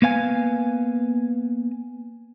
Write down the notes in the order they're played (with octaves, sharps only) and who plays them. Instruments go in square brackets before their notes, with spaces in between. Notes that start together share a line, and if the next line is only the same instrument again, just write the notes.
[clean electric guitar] A#3 B3 F5 G#5